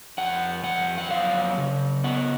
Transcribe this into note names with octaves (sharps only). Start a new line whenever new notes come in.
F2 F#5
F2 F#5
F#5
F#3 F5
C#3
B3 F#5